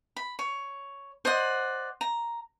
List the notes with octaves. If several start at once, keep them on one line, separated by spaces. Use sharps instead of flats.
B5
C#5
C5 D5 D#5 F#5
A#5